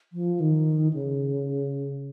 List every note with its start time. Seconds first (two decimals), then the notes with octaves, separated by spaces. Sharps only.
0.13 F3
0.40 D#3
0.93 C#3